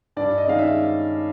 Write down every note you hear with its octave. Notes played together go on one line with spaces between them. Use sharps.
G2 D5
D#5
D#3 G#3 C#4 F5
E5